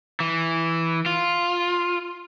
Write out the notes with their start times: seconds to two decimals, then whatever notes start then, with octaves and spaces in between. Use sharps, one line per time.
0.20 E3
1.06 F4